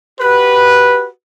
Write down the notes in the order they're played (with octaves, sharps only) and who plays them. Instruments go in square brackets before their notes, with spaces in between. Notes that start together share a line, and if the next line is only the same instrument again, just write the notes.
[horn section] F#4 G4 B4